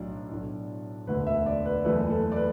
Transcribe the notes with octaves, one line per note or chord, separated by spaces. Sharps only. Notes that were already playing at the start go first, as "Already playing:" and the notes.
Already playing: B1 A2 F#3 D4
B1 A2 A3 D4
E1 D2 D3 B4
E5
D5
B4
F#1 E2 E3 A3 B4
A4
D5
B4